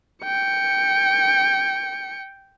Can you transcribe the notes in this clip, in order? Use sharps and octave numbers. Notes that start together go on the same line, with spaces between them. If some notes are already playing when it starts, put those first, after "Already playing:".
G5 C#7